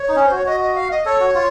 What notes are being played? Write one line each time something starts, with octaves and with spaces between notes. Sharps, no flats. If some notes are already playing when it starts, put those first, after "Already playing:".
Already playing: C#5
D#4
C#4
C5
F#4 C#5
F#4 D#5
D#5
F5
D#5
A4 C#5
F#4
F4